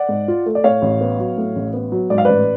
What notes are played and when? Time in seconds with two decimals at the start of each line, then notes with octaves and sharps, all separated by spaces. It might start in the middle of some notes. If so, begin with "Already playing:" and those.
Already playing: D5 F#5
0.09 G#2
0.28 F4
0.46 A3
0.55 D5
0.64 A2 C#5 F5
0.82 A1
1.01 B3
1.19 F#3
1.38 A2
1.56 A1
1.73 B3
1.92 F#3
2.10 G#2 D5
2.18 F5
2.25 A1 B4 D5